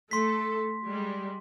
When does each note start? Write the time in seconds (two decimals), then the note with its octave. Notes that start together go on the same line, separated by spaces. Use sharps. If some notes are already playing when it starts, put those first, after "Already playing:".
0.11 A3 A4 C6 B6
0.88 G3 G#3